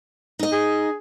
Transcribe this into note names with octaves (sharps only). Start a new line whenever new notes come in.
D#4 D#5
G#4